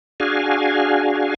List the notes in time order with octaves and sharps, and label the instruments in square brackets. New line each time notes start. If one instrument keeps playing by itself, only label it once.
[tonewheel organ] D4 F#4 G#4 F5 G#5